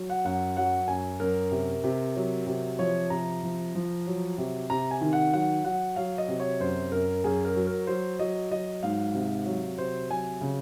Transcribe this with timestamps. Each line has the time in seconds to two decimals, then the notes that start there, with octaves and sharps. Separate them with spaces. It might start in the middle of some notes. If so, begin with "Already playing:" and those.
Already playing: F#3
0.10 F#5
0.24 F#2 F#5
0.57 F#3 F#5
0.88 F#2 G#5
1.20 F#2 A#4
1.51 C3
1.84 C3
2.16 F#3
2.47 C3
2.79 F3 C#5
3.10 C3 A#5
3.43 F3
3.75 F3
4.07 F#3
4.38 C3
4.70 C3 A#5
4.91 G#5
5.01 D#3
5.13 F#5
5.33 F#3 F#5
5.64 F#3 F#5
5.96 F#3 F5
6.18 D#5
6.28 C3
6.40 C#5
6.60 F#2 C5
6.92 F#2 A#4
7.24 F#2 G#4
7.45 A#4
7.56 F#3
7.67 A#4
7.87 F#3 C5
8.19 F#3 D#5
8.51 F#3 D#5
8.83 G#2 F5
9.14 C3
9.46 F#3
9.78 C3 C5
10.09 F#3 G#5
10.41 C#3